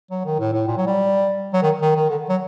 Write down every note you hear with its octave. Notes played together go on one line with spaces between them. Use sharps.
F#3
D#3
A2
A2
A#2
F#3
G3
F#3
D#3
D#3
D#3
D3
F#3